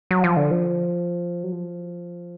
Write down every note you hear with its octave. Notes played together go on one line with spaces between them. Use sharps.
F#3
F3
D3
F3
F#3
F3